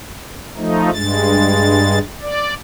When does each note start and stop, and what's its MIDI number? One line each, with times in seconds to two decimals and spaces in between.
0.57 0.90 53
0.57 0.90 57
0.57 0.90 63
0.93 1.99 43
0.93 1.99 56
0.93 1.99 93
2.21 2.54 74